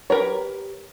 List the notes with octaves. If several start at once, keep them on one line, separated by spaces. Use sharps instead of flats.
G4 A#4 B4 C#5